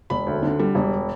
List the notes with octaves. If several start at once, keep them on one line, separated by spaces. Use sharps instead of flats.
E1 B5
D2
D3
G3
E1